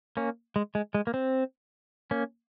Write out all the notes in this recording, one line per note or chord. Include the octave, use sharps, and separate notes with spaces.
A#3 C#4
G#3
G#3
G#3
A#3
C4
A#3 C#4